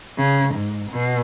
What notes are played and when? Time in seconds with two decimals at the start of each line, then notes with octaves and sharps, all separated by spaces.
0.19 C#3
0.55 G#2
0.91 B2